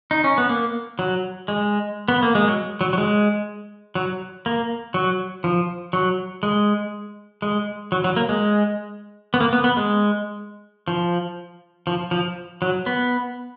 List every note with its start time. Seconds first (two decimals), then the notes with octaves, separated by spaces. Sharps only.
0.11 D#4
0.24 C#4
0.38 B3
0.49 A#3
0.99 F#3
1.48 G#3
2.08 B3
2.23 A#3
2.35 G#3
2.48 F#3
2.81 F#3
2.93 F#3
2.98 G#3
3.95 F#3
4.46 A#3
4.94 F#3
5.44 F3
5.93 F#3
6.43 G#3
7.42 G#3
7.92 F#3
8.04 F#3
8.16 A#3
8.29 G#3
9.34 B3
9.40 A#3
9.53 B3
9.64 B3
9.77 G#3
10.88 F3
11.87 F3
12.11 F3
12.62 F#3
12.86 B3